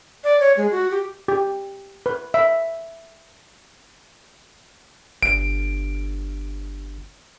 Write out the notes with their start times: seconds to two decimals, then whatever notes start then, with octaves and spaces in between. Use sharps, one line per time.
0.24 D5
0.40 C#5
0.57 G#3
0.72 F#4
0.91 G4
1.28 G4
2.06 B4
2.34 E5
5.23 G1 D7